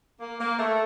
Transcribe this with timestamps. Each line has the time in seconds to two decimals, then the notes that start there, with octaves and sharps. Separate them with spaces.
0.20 A#3
0.39 A#3
0.58 A3